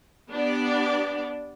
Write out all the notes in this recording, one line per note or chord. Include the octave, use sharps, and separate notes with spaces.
B3 D4 G4 D5